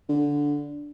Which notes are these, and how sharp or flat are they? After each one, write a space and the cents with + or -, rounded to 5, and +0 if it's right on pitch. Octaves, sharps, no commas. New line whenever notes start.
D3 -10